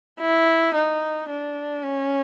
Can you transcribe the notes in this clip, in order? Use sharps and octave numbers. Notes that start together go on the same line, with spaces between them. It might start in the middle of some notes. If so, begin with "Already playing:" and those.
E4
D#4
D4
C#4